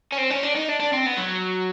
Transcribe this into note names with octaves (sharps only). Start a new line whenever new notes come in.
C#4
C4
C#4
D4
D#4
D4
D4
C4
B3
F#3